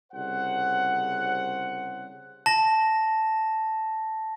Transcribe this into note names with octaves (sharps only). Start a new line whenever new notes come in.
C2 C#3 C5 F#5
A5 A#6